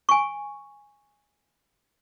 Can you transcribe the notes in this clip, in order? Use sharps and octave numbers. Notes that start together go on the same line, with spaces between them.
G#5 C#6